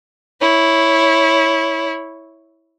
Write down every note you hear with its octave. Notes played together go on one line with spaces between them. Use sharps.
E4 C#5